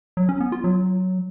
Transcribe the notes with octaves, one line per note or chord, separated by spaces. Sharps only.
F#3
C#4
B3
F4
F#3